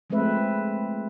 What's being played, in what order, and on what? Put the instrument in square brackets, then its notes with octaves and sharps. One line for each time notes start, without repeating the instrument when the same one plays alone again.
[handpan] F3 G#3 A3 C4 B4 E5